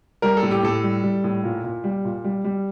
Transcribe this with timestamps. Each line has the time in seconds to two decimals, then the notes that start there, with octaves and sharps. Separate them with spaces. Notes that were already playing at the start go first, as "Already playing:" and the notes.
0.22 G3 A#4
0.37 A4
0.43 A2
0.51 G4
0.63 A2 A4
0.83 G3
1.03 G3
1.24 A2
1.44 A#2
1.64 A#2
1.84 G3
2.05 A#2
2.24 G3
2.44 G3